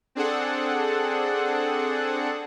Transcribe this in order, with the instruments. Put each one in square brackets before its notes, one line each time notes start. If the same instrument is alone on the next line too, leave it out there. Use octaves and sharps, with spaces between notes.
[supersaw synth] C4 D4 G#4 A4 F#5